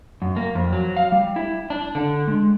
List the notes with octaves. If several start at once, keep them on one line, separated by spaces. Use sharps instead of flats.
F#2
A#3
F2
F#3
F5
G3
E4
D4
D3
G#3